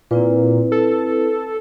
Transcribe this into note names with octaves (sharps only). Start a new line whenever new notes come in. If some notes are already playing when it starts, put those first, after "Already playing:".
A#2 C4 E4 B4
A4